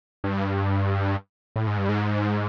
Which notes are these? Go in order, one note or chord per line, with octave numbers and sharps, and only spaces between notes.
G2
A2
G#2
G2
G#2